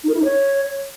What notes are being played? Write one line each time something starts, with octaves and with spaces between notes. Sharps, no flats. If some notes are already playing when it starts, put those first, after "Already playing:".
D#4
A#4
E4
D#4
C#5